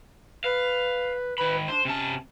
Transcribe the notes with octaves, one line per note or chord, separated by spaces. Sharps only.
B4 F5
D#3 B4 B5
D4 C5
C3 C#4 A5